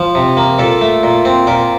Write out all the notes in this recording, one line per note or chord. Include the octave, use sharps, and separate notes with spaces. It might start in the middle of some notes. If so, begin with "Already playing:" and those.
Already playing: F3
C3
A#3
A#2 A4
A3
A#2
C4
A#2 A#4